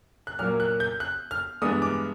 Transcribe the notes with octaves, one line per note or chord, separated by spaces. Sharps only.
F#6
A#2 F#3 A#3 F6
F#6
G6
F#6
F6
G2 E3 G#3 B3 D4 D#6
D6